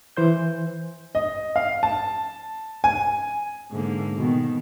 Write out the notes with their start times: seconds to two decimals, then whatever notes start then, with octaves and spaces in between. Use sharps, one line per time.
0.17 E3 C5 G6
1.15 D#5
1.56 F5
1.83 A5
2.84 G#5
3.71 G#2 D3 A#3
4.16 B2 D#3